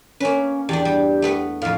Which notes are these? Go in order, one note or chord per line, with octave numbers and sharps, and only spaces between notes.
A#3 C#4 B4
E2 D4 G4
G3
A3 B3 B4
F2 A2 F5